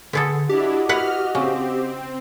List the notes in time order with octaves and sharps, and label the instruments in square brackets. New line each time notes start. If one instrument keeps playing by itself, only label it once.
[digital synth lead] D3 [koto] B3 G#4 A4
[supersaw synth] D4 E4 [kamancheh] F#4 D#5 [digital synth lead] G4
[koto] E4 B4 F#5 [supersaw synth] F6
[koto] C#3 [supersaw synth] C4